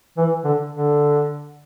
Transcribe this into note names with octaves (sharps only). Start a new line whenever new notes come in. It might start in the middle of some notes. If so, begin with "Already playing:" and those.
E3
D3
D3